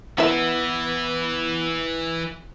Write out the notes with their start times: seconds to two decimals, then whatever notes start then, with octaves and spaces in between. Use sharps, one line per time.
0.18 E3 B3 E4 D#5 E5